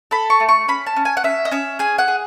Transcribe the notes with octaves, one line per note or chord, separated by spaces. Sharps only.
A4 B5
C#6
A3
C#6
C#4 B5
A5
C#4
G#5
F#5
C#4 E5
D#5
C#4 E5
G#4 G#5
F#5
G#4